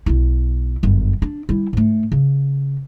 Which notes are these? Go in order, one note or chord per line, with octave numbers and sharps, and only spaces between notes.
B1 E4
G1 F#2
D4
G3 E4
G#2 A3
C#3